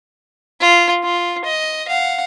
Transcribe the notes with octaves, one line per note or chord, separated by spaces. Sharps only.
F4
F4
D#5
F5 F#5